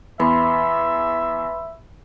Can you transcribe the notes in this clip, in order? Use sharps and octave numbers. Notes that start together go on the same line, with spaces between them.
E2 B4 E5 B5 C6